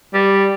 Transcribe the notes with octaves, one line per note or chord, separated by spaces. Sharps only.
G3